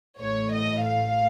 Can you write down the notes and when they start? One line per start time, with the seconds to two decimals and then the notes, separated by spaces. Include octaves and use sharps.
0.19 A1 A2 A3 C#5
0.52 D#5
0.85 F5